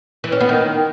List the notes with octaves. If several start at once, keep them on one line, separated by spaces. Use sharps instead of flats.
E3
C#4
B3
D#3